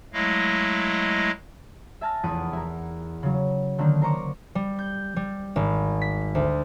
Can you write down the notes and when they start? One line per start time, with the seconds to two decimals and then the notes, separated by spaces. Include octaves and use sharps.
0.13 F#3 G#3 A3 E4 D#5 F5
2.01 E5 G#5 A5 F6 A#6
2.23 F1 E2 B4 F#5 D#6 D7
2.53 E4 A#4
3.23 C#3 F#3
3.78 D3 D#3 A#3 D4 D#4
4.02 A#4 C5 A#5 C#6 D6
4.55 G3
4.79 G6
5.16 G3
5.56 G#1
6.02 B6
6.35 D2